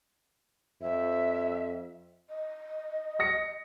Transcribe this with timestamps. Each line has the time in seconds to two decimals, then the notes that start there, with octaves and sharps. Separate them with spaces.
0.81 F2 E5
2.29 D#5
3.19 D#6 A#6 C#7